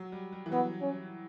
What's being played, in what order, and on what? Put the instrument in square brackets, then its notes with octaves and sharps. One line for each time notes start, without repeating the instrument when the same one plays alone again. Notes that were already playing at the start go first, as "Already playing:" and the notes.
Already playing: [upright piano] F#3
G3
G3
E3
[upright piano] F#3 [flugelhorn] B3
[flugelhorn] C#4